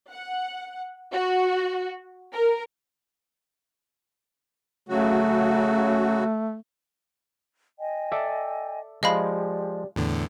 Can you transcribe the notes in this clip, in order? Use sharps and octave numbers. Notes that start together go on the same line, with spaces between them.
F#5
F#4
A#4
C#3 F#3 A3 F#4
D#5 G5 G#5
A4 D5 E5
F3 G#3 G4 D5 D#5 F5 B5
E2 A2 D3